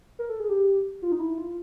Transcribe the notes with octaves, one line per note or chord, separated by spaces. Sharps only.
A#4
A4
G#4
G4
F4
D#4
E4
F4